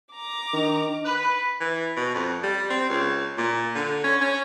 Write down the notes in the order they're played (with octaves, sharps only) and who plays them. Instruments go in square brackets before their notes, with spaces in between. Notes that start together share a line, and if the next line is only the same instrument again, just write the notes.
[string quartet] A#5 D6
[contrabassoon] D#3 [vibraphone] D4 D#5
[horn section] B4
[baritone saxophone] E3
B2
F2
G3
C4
C#2
A#2
D3
C#4
C#4